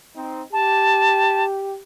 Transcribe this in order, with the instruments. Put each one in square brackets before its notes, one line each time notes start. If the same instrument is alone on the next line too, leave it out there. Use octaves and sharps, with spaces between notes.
[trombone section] C4 D#4
[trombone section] G4 [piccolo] A5